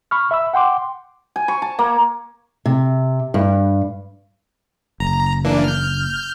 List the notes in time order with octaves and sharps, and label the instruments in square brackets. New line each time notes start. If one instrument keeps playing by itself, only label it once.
[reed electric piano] B5 C#6 F6
E5 B5 E6
F#5 G5 C6 D6
[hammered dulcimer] G#5
C#6
A5
A#3
[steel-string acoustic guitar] C3
G2
[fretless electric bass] F#1 [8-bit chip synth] A#5
[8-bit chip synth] E3 A#3 D4
F6 G6